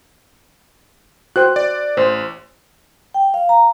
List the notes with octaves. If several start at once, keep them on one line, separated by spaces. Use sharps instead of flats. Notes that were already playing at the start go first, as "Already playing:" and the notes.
F#4 C5 G5 F#6
D5
A1 C5
G5
F5
A#5